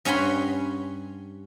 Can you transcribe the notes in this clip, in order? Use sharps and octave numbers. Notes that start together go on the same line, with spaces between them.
G2 C#4 C#5 F#5 B5 C6